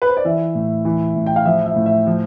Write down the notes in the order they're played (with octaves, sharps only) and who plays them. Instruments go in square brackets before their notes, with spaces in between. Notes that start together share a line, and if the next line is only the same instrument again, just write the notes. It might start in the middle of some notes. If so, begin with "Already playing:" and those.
[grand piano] B4
C5
D5
E3 E5
A2
E3
A2
G5
F5
F3 E5
E5
A2
E5
F3